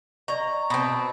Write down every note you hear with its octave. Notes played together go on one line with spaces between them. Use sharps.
D5 D#5 A#5 C#6
B2 C4